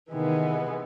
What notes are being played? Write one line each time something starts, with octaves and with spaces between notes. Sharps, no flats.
C3 D#3 E3 G#3 B3